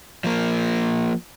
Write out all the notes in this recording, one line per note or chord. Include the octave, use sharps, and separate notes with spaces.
F3 A#3